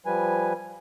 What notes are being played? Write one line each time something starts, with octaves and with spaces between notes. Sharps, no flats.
F3 G3 B4 G#5